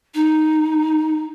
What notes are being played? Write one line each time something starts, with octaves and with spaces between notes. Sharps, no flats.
D#4